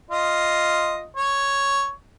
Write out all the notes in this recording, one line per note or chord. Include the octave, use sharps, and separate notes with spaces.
F4 D#5
C#5